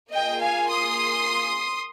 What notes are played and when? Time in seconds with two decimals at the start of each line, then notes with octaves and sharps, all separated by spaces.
0.14 A#3 F4 G#4 D#5 G5
0.42 F5 G#5
0.70 C6 D#6